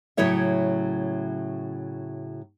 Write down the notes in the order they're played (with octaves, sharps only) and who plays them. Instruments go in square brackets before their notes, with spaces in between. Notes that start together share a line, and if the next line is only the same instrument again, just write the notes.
[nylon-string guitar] A2 C#3 F#3 E4 C#5 E5